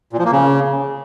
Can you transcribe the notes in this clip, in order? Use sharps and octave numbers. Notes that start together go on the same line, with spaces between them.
A#2
F3
A#3
C#3